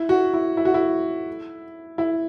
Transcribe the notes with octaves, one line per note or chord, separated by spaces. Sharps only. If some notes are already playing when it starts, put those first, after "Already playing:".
Already playing: E4
F#4
E4
E4
F#4
E4
E4